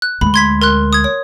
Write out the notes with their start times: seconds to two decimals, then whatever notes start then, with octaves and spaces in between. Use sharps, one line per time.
0.02 F#6
0.21 D2 G#3 B5
0.34 C6 G#6 B6
0.62 A#4 C6 F#6
0.93 D#6 G#6
1.04 C#5